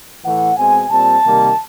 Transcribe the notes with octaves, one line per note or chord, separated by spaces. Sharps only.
A2 E3 A3 F#5
B2 G#3 C4 G#5
A#2 G3 C4 A5
C3 D#3 G3 A#3